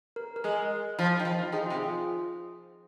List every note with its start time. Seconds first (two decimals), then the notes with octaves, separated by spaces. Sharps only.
0.16 A#4
0.36 A#4
0.44 G#3 G#4
0.99 F3
1.20 D#3
1.25 F3
1.43 F4
1.52 D#3 G#4
1.66 F4
1.70 C3
1.79 G#4